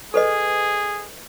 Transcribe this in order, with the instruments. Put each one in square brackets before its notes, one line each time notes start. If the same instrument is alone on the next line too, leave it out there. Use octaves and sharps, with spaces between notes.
[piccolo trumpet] G#4 [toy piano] A4 B4 D#5